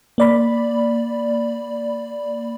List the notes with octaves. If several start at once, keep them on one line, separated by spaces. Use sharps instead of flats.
A#3 D5 B5